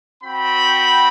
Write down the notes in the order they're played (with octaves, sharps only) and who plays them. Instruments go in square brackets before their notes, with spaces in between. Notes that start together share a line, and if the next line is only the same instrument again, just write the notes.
[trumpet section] C4 F#4 G5 B5